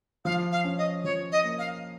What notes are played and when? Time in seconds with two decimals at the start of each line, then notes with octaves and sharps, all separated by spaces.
0.25 F3 F5
0.51 F5
0.65 C#4
0.77 D#5
1.04 F3 C#5
1.31 D#5
1.44 A#3
1.58 F5